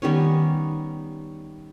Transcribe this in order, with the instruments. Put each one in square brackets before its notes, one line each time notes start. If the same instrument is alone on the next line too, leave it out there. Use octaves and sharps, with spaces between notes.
[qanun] D#3 G3 B3 C#4